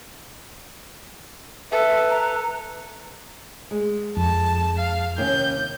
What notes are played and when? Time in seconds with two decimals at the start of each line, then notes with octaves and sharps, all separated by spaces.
1.72 A4 B4 E5
2.10 A#5
3.71 G#3
4.17 F2 A5
4.78 F5
5.18 D#2 C3 C#4 G6